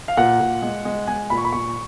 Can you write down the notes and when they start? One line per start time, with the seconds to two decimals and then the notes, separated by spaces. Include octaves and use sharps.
0.08 F5
0.17 A#2 F#5
0.40 A#2
0.62 G#3
0.85 G#3
1.07 G#3 G#5
1.30 A#2 B5
1.37 C#6
1.45 B5
1.52 A#2 C#6